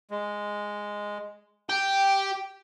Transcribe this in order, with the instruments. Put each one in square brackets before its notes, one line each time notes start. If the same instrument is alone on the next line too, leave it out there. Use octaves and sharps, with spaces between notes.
[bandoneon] G#3
[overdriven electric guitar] G4 [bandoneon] G5